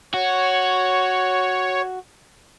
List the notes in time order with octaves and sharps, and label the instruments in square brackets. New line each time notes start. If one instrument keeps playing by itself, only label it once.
[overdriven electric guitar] F#4 [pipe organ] C#5